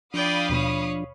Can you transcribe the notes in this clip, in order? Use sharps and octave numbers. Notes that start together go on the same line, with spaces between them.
F3 D4 D5 F5 G5 B5 D#6
D#2 B2 C#5